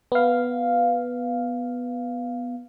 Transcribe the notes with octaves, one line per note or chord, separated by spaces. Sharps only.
B3 F5